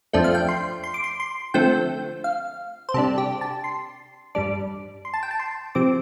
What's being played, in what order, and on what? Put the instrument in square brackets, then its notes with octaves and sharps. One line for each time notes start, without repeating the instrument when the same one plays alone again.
[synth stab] F2 F3 A3 D4 G5
F5
G5
C6
C6
D6
C6
C6
D3 F3 A3 C4 G5
F5
C5
C3 G3 D4 A4
G4
A5
C6
G2 G3 D4 D6
C6
A5
G5
A5
C6
C3 F3 C4 D6